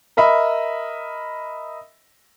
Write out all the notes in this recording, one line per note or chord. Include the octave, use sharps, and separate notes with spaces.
A#4 D#5 E5 B5